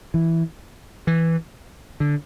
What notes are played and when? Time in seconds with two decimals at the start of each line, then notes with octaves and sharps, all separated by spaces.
0.14 E3
1.07 E3
2.00 D3